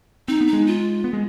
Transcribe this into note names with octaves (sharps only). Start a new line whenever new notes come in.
C4 D#4
B3
D#4
G#3
F4
B3
G#3